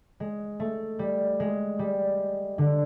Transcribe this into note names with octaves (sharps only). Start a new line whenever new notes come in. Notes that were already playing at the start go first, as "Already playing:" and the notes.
G#3
A3
G3
G#3
G3
D3